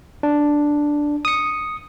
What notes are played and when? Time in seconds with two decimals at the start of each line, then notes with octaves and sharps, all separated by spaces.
0.23 D4
1.25 D#6 C#7